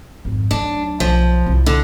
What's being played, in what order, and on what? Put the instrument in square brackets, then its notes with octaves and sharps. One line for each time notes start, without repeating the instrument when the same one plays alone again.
[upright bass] G#1 F2
[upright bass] D2 F#3 [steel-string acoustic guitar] D4
[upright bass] B1 [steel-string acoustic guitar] F3
[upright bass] C2
[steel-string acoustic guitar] D3